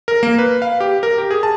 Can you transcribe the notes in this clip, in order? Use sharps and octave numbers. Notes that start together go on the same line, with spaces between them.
A#4
A#3
B4
F5
G4
A#4
G4
G#4
A5